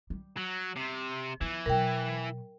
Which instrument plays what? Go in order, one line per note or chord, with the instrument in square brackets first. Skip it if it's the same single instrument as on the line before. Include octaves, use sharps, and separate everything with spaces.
[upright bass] G3
[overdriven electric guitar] F#3
C3
[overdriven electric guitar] E3 [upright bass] F3 B3
[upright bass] B2 F#3 [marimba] A#4 G5